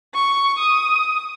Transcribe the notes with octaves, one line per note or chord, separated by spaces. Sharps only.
C#6
D#6